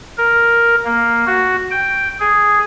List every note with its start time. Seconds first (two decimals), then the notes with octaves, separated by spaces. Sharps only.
0.18 A#4
0.85 A#3
1.27 F#4
1.71 G5
2.20 G#4